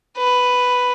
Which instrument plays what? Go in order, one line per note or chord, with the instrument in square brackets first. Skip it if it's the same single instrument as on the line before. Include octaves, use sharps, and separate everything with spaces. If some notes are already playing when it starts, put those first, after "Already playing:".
[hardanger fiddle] B4